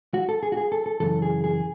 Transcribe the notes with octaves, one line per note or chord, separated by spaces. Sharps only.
F#4
A4
G#4
F#4
G#4
A4
A4
F#2 C#3 E3 A4
G#4
G#4